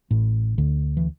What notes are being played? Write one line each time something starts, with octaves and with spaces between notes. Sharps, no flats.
A1 A2
D2 D3
E3